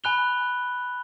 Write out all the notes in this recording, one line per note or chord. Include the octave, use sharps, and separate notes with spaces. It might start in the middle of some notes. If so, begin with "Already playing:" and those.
G#5 B5 F#6 F7 G7